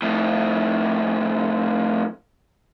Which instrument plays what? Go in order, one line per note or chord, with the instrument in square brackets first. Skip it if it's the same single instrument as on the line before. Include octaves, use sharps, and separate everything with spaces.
[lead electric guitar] F2 A2